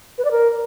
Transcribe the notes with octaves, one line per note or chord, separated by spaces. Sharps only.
B4
D5
A#4